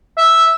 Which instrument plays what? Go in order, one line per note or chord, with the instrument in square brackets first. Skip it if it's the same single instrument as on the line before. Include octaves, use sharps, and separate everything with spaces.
[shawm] E5